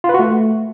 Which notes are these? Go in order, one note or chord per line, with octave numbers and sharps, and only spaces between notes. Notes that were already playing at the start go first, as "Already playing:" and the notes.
F4
B4
F#4
A3